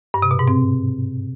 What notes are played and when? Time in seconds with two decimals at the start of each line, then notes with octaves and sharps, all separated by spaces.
0.14 G2
0.22 C3
0.31 B2
0.39 G#2
0.48 C4